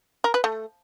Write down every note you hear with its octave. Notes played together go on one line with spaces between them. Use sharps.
A#4
B4
A3